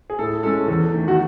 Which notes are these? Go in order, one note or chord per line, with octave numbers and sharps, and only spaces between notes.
G#4
A2 A4
G#3 C#4 A4
E2 A4
D#3 A3
F#4